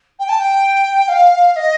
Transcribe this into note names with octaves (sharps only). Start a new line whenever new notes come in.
G5
A5
G5
F5
F5
D#5